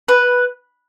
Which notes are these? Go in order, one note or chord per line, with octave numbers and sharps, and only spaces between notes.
B4